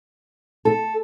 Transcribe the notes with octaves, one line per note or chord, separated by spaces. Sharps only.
A4